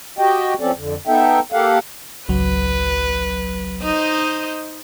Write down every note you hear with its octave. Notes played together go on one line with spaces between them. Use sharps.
F#4 G4 D#5 G5
F3 C4 C#4 A4 D5
F2 D3
B3 D#4 A4 E5 G5
A#3 G4 A4 F5 F#5
G#1 C#2 F#3 B4
D#4 C5 D#5